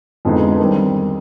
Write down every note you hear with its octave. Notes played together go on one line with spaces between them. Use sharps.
F2 D3 G#3 B3 D#4
D#3 G3 C4